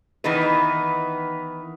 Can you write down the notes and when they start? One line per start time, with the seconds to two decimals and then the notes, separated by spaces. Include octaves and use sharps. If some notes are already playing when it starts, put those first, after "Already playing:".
0.24 D#3 E3 B3 D#4 B4